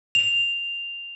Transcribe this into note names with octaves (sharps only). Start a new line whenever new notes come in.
F7